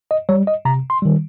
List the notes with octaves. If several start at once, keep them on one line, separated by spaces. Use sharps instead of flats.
D#5
G3 C#5
D#5
C3 A#5
C6
D#3 G3